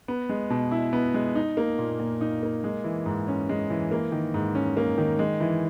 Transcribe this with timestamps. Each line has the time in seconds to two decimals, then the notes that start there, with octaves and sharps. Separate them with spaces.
0.08 B3
0.29 G#3
0.50 B2
0.71 E4
0.93 B3
1.14 G#3
1.35 D#4
1.57 A#3
1.79 A#2
1.99 A#2
2.21 D#4
2.43 A#3
2.64 G#3
2.84 E3
3.06 G#2
3.28 C#4
3.49 G#3
3.70 E3
3.91 A#3
4.12 D#3
4.34 G#2
4.55 C#4
4.77 A#3
4.98 D#3
5.19 G#3
5.40 E3